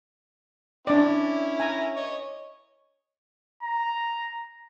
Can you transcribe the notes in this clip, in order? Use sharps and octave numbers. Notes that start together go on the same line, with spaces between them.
C#4 D4 E4 D5
G#5 A#5
C#5 D#5
A#5